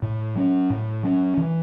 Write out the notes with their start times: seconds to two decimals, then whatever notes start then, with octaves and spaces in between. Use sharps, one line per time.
0.02 A2
0.35 F#3 C#4
0.70 A2
1.03 F#3 C#4
1.37 E3